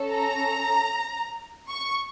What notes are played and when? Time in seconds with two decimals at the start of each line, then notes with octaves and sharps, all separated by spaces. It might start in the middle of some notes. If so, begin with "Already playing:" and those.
Already playing: C#4 A4
0.11 A#5
1.71 C#6